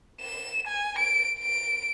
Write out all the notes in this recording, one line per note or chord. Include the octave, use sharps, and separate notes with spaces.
E7
G#5
D7
D7